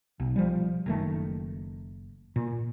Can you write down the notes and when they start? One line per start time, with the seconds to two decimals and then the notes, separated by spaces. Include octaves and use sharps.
0.20 B1
0.36 F3 G3
0.86 F#1 D#3 A3
2.36 A#2